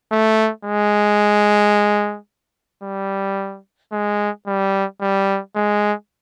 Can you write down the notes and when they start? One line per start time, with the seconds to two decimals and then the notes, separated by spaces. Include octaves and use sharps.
0.12 A3
0.65 G#3
2.83 G3
3.92 G#3
4.47 G3
5.01 G3
5.55 G#3